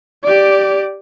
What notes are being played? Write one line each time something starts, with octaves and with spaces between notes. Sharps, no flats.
G4 D5